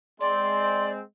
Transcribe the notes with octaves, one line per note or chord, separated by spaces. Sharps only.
G#3 C4 D5 C6